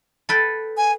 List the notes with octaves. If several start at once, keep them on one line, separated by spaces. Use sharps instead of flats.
A4 B4 G5
G#5